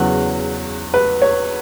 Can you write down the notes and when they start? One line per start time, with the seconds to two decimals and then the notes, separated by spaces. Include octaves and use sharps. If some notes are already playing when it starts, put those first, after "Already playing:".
Already playing: E2 C#3 F#3 F#5
0.94 B4
1.22 C#5